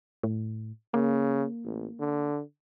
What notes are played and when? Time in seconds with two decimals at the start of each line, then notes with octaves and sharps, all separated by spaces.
0.23 A2
0.94 C#3 A#3
1.65 A1
2.00 D3